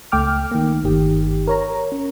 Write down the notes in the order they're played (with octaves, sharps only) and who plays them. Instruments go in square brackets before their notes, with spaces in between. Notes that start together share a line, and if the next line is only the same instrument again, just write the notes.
[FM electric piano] C#2 A3 G5 D6 F6
D#3 A#3
G1 D#3 G4
A#4 C#5 A#5
C#4